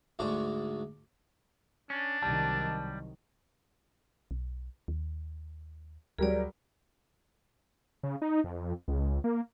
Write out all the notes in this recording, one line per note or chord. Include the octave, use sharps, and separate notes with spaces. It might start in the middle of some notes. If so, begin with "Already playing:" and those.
D2 G#2 G#3 D4 C#6
C#4 D4
C2 D#3 F#3 G3 A5
B1
D#2
D2 F#3 G3 G#4 A#4 D5
C#3
D#4
F2
C#2
A#3